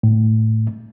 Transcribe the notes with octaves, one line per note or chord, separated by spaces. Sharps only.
A2